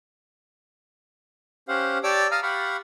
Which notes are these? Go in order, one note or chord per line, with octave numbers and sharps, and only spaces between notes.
C#4 G4 C5 F5 F#5
G4 C#5 D5 A5 D6 E6
F5 A5 A#5 D#6 F6
G4 F5 F#5 B5 C#6